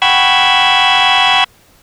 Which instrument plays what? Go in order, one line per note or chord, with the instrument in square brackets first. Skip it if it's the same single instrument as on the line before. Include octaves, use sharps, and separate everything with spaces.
[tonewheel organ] F#5 G5 B5 C#6 E6 G#6